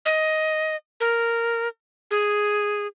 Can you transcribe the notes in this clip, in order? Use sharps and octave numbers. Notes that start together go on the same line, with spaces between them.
D#5
A#4
G#4